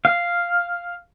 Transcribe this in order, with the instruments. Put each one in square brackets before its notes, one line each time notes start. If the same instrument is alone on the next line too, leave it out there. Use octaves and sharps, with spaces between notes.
[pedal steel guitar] F5